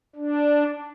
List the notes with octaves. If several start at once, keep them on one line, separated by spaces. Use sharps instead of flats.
D4